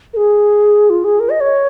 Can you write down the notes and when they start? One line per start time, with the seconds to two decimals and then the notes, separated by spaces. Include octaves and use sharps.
0.13 A#4
0.17 G#4
0.90 F4
1.04 G#4
1.20 A#4
1.30 D#5
1.40 C#5